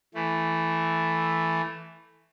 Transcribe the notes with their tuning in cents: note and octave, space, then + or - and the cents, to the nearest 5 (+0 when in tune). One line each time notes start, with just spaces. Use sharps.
E3 +0 A3 +0